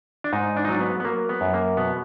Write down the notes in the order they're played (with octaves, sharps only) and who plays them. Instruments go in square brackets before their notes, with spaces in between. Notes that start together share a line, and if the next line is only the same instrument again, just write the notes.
[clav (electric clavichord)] D4
G#2 D#4
D4
D#4
F#3 D4
B3
B3
F#3 A#3
B3
F#2
A#3
B2 B3